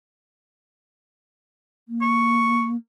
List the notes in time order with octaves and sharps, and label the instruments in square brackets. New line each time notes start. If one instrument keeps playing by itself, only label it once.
[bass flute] A#3
[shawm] C#6